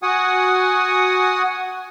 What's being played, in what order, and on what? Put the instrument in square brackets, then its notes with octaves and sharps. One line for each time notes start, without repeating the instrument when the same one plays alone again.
[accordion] F#4 F#5 G#5 D#6